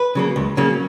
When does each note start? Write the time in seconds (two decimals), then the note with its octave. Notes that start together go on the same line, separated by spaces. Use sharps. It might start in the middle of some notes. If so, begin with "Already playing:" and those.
Already playing: B4
0.15 C#3 F#3 A#3
0.36 C#2
0.57 C#3 F#3 A#3